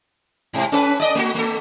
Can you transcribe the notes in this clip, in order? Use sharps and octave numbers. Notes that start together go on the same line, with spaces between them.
G#2 C3
C#4 A4 B4
D5 D#5
A3 F#4
A3 A4